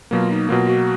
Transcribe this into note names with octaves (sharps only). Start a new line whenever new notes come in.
B2 F#3 A#3 F4
D#4
B2 F#3 A#3 F4
F#4